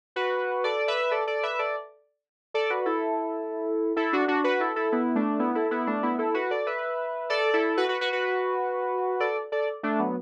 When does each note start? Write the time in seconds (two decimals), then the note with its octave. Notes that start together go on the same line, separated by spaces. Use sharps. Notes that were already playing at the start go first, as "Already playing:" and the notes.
0.16 F#4 B4
0.64 A4 D5
0.88 B4 E5
1.11 A4 D5
1.27 A4 D5
1.43 B4 E5
1.59 A4 D5
2.54 A4 D5
2.70 F#4 B4
2.86 E4 A4
3.96 E4 A4
4.13 D4 F#4
4.28 D4 F#4
4.44 F#4 B4
4.60 E4 A4
4.76 E4 A4
4.92 B3 E4
5.15 A3 D4
5.39 B3 E4
5.55 E4 A4
5.71 B3 E4
5.87 A3 D4
6.03 B3 E4
6.18 E4 A4
6.34 F#4 B4
6.51 A4 D5
6.67 B4 E5
7.30 A4 D5
7.53 E4 A4
7.77 F#4 B4
7.89 F#4 B4
8.01 F#4 B4
8.13 F#4 B4
9.20 A4 D5
9.52 A4 D5
9.83 A3 D4
9.99 F#3 B3